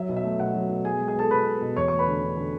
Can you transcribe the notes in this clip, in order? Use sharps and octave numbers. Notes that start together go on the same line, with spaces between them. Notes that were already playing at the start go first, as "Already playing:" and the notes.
Already playing: F#3 E5
B2
E5
A3
B2 F#5
F#3
B2
B3 G#4 G#5
G#3
G#4 G#5
B3 A4 A5
B2 B4 B5
B3
B2
E2 C#5 C#6
A3 C#6
B4 B5
D3
D3
D3